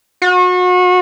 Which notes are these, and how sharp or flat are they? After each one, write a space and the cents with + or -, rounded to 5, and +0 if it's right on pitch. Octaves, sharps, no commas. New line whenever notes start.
F#4 -35